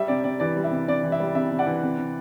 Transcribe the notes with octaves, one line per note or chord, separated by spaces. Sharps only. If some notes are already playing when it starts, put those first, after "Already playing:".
Already playing: G3 E5
C3 D5
C3 D5
E3 D5
G3
E5
C3
C3 D5
E3
E5
G3
C3 E5
C3
D5 F#5
E3
C3
C3